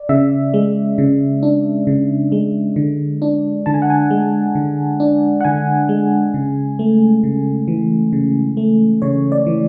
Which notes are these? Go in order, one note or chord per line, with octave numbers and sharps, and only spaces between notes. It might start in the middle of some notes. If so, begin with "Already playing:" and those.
Already playing: D5
C#3 E5
G#3
C#3
D4
C#3
G#3
D3
D4
D3 A5
G#5
F#5
G#5
G#3
D3
D4
F#5
D3 G#5
G#3
C#3
A3
C#3
E3
C#3
A3
C#3 C#5
D5
E3